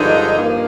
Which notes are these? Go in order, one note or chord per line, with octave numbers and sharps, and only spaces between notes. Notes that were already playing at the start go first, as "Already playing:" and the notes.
Already playing: G2 D3 F3 G#3 D#4
G2 F3 A#3